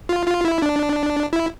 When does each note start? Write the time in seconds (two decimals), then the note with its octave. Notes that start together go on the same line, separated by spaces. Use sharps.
0.09 F4
0.27 F4
0.45 E4
0.62 D4
1.33 E4